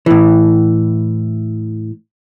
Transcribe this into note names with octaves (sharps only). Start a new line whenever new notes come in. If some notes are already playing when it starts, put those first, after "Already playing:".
A2 E3